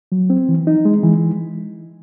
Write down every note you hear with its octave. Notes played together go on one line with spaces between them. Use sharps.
F#3
C4
E3
D#4
G#3
E3